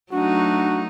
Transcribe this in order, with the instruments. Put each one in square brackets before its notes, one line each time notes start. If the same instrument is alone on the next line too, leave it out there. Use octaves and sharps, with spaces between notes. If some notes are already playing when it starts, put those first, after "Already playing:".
[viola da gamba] F#3 A3 D#4 [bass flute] D4 [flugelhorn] F#4